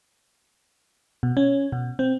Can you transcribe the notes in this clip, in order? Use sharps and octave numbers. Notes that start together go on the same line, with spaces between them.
B2
C#4
B2
C4